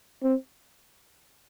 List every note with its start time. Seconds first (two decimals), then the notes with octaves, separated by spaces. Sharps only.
0.23 C4